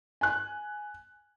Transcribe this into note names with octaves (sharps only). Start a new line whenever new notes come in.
G#5 F#6